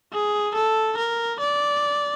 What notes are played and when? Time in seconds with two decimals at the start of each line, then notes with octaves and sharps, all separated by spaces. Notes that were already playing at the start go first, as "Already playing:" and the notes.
0.13 G#4
0.55 A4
0.98 A#4
1.40 D5